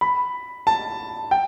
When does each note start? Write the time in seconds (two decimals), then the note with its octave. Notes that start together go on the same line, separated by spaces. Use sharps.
0.01 B5
0.67 A5
1.31 G5